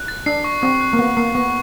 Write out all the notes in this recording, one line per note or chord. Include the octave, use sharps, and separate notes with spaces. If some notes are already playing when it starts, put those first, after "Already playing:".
Already playing: F#6
A6
D4 C7
C#6
C4 C#6
F#6
A#3
B3 C#6
A#3 C7
B3 C#6